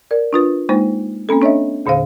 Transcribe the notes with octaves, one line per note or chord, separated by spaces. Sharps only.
A#4 D5
D4 F4 B4
G#3 A#3 D#4 C5
A#3 C4 C#4 A4
D4 C#5 D#5 E5
E2 A#2 D3 C5 F5